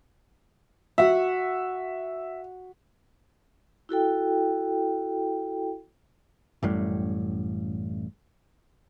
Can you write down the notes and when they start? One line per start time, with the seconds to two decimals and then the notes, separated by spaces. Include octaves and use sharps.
0.98 F#4 E5 F#5
3.89 E4 F#4 A4 G5
6.63 A1 F#2 A2 G3